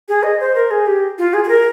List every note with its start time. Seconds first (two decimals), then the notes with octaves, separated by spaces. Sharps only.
0.08 G#4
0.23 D#5
0.40 C5
0.55 A#4
0.71 G#4
0.87 G4
1.18 F4
1.34 G#4
1.44 G#4
1.49 A#4